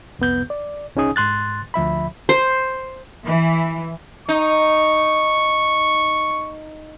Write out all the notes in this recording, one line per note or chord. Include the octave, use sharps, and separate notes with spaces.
C2 F2 B3 G6
D5
C2 C#4 D#4 G#4 G#5 D#6
G#2 C6 F#6 A6
D2 F3 E5 B5
C5
E3
D#4 C#6